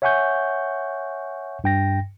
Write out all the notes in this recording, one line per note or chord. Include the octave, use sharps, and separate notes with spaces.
C#5 E5 F#5 G#5 C#6 G6
G2 G5 A#6